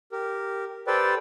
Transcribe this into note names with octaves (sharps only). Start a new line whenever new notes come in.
G4 A#4
G4 A4 B4 C5 D5 G5